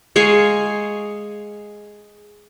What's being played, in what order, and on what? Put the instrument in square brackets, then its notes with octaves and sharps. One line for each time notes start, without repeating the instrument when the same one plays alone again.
[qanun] G#3 G#4 F5 C#6